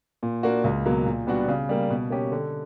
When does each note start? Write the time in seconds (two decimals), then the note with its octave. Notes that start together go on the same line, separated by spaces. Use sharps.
0.23 A#2
0.43 A#3 D4 F#4
0.64 C#2
0.86 B2 F#3 A#3
1.06 A#2
1.27 G3 B3 D4 F#4
1.48 C#3
1.69 G3 A#3
1.90 B2
2.10 A#3 C#4 G4
2.32 D3